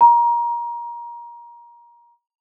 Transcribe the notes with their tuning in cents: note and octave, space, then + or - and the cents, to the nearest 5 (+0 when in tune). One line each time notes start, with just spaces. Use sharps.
A#5 +25